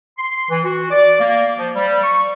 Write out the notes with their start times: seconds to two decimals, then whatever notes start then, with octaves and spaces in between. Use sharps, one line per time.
0.18 C6
0.50 E3
0.65 F#4
0.90 D5
1.20 A#3
1.58 F3
1.75 G3
2.03 C#6